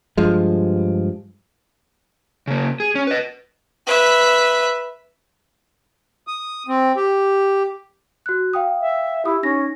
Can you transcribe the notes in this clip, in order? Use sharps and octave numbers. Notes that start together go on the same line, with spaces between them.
G2 F3 G#3
C#3 A#3
G#4
C#4
B4 D#5
B4 E5
D#6
C4
G4
F#4 F#6
F5 G5 D#6
E5
E4 G4 D#6
C#4 D#4 A#6